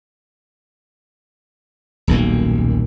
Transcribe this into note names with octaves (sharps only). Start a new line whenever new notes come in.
D#1 B1 F#2 A#3